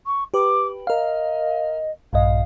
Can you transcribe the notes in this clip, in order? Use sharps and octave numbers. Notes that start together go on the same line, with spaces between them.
C#6
G4 B4 D6
A#4 D#5 F5
A#1 G2 D#5 F5